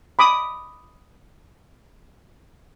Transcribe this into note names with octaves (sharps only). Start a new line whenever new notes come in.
B5 D6 D#6